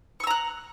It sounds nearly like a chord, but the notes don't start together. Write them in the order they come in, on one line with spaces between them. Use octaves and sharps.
C#6 E6 A#5 F#6